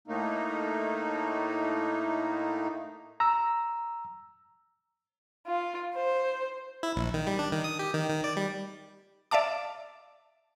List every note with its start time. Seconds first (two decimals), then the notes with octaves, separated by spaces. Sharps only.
0.08 A2 A3 A#3 D#4
3.20 A#5 E6
5.45 F4
5.94 C5
6.83 E4
6.96 A#1
7.14 D#3
7.27 G3
7.39 D4
7.52 D#3
7.64 D#6
7.79 G4
7.94 D#3
8.10 D#3
8.24 D5
8.37 G3
9.31 D5 E5 F5 A5 D6